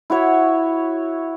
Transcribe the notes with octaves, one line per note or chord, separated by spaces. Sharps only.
E4 F#4 C#5 E5